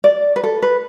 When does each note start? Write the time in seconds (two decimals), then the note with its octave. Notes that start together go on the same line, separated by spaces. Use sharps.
0.04 D5
0.36 B4
0.44 A4
0.62 B4